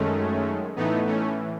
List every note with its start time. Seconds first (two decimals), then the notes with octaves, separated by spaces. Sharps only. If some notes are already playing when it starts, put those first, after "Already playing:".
Already playing: F#2 D#3 G#3 A3 C#4
0.76 A2 E3 A3 B3 D#4
1.07 A3 C#4